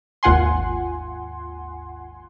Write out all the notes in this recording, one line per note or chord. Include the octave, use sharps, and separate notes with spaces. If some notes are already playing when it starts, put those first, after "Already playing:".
G#1 D#2 F4 F#5 G#5 C6